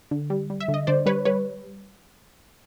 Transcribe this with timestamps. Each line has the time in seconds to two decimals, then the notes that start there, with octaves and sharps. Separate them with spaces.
0.11 D3
0.30 G3
0.50 G3
0.60 E5
0.68 D3
0.74 D#5
0.87 D3 C5 D5
1.06 G3 B4 C#5
1.25 G3 B4 C#5